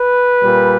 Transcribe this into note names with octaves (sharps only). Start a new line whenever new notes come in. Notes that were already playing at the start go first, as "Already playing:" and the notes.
Already playing: B4
A#2 G3